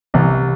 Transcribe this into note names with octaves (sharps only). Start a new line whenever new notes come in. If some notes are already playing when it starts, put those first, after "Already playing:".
C2 E3